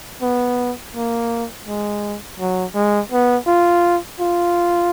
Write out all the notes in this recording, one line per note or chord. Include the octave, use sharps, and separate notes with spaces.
B3
A#3
G#3
F#3
G#3
B3
F4
F4